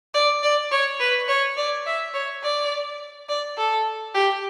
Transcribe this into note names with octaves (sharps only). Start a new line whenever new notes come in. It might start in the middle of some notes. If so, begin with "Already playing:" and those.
D5
D5
C#5
B4
C#5
D5
E5
C#5
D5
D5
A4
G4